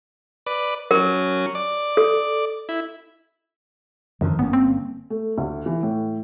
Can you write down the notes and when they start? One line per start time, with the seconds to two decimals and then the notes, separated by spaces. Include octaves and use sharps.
0.47 B4 D5
0.91 F#3 C#4 A#4
1.55 D5
1.97 A4
2.69 E4
4.21 F#2 D3 D#3 F3
4.39 G1 A#3 B3 C#4
4.53 C4
5.10 A3
5.38 D2
5.66 E3
5.83 A2